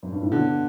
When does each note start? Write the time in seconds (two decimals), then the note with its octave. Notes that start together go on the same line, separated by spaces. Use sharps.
0.03 F#2
0.12 G2
0.22 A2
0.32 B2 D3